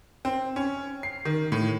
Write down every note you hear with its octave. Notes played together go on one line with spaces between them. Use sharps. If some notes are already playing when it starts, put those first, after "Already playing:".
C4
C#4
C7
D#3
A2